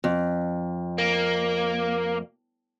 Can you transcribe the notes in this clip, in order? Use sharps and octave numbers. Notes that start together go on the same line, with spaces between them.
F2
A#3